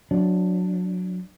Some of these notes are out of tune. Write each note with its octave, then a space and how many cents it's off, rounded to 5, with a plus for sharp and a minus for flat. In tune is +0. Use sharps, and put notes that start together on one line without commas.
F#3 -20 D4 +0